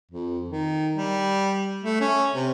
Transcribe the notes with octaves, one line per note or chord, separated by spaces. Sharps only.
F2
D#3
G3
A3
C#4
C3